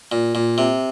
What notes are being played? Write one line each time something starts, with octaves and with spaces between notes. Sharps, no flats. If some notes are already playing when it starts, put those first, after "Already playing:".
A#2
A#2
C3